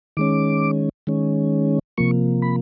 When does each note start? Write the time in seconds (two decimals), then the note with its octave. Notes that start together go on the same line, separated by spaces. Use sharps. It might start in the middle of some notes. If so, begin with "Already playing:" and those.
0.17 D#3 G#3 C#4 D6
1.07 D#3 G#3 C#4
1.98 C3 F3 A#3 C#6
2.42 B5